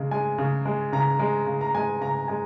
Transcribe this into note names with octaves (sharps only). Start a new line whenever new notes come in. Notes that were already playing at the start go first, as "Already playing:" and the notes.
Already playing: C#3 G#3
G#3 G#5
C#3
G#3
C#3 A#5
G#3
C#3
A#5
G#3 G#5
C#3 A#5
G#3 G#5